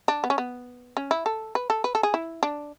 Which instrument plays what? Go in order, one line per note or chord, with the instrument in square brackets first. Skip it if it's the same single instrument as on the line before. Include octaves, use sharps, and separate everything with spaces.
[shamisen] D4
B3
C#4
B3
C#4
E4
A4
B4
A4
B4
A4
G#4
E4
D4